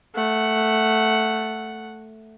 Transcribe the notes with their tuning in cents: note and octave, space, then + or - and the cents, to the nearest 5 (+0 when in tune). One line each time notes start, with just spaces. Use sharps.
A3 +0 F#5 +0